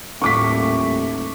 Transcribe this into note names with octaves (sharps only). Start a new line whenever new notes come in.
D#1 A2 A3 C#6 D6 B6